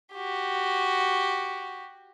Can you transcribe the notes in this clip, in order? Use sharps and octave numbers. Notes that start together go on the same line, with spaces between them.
F#4 G4